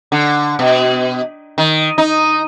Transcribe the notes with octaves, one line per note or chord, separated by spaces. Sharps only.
D3
B2
D#3
D#4